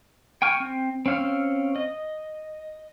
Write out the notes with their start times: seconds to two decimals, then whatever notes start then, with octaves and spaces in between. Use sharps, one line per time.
0.42 G5 G#5 C#6 F6
0.60 C4
1.06 C4 C#4 F5 E6 F6
1.76 D#5